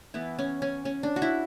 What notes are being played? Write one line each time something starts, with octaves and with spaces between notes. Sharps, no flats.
E3 B3 E4
C#4
C#4
C#4
D4
F#4
E4